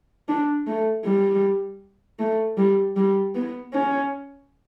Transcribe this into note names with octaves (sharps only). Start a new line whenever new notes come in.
D4
A3
G3
A3
G3
G3
B3
C#4